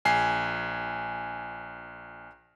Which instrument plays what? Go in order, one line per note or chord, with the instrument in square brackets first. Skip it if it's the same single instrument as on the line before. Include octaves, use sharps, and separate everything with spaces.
[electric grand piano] A#1 G#5 C7